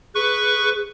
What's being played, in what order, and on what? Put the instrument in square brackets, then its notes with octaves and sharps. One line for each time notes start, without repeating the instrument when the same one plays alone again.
[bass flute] G#4 [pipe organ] B4 C#6